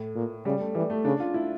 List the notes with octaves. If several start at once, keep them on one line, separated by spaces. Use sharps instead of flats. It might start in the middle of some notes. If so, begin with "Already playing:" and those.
Already playing: A2
A#2
C#3 G3
A3
E3 G3
A3
C#3 D4
F4
E4